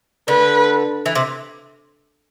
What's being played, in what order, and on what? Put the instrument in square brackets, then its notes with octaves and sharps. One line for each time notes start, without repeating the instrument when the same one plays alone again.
[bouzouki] D3 [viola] B4
[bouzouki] E3
C3